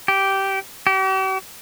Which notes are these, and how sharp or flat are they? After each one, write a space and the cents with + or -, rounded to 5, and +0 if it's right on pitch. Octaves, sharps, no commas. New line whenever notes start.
G4 -10
G4 -45